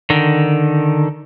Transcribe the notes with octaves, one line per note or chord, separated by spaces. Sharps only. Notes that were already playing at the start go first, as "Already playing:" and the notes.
D3 D#3